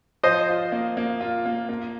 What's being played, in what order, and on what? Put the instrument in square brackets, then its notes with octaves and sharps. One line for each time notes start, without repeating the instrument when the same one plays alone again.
[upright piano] F3 [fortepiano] C5 D#5
[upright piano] F4
A#3
A#3
F4
A#3
A#3